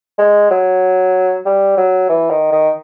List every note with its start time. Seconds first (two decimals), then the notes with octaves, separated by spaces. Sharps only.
0.19 G#3
0.51 F#3
1.46 G3
1.77 F#3
2.10 E3
2.30 D#3
2.52 D#3